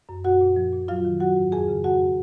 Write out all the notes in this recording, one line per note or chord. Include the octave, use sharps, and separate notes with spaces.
F#2
A#2 F#4 F#5
A#2
F3
A#2
F#3 F4 F5
D#3
F#3 F#4 F#5
G#2
F2 G#4 G#5
C#3
F2 F#4 F#5